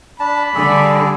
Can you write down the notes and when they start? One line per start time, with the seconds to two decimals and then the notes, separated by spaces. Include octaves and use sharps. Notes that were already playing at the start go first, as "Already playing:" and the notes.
0.20 D4 A5 B5
0.55 D3 G3 G#4 A4 D5